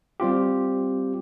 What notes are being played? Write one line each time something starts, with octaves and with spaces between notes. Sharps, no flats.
G3 C4 F4 G4